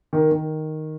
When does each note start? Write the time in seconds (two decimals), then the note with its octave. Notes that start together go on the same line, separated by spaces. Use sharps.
0.13 D#3
0.31 D#3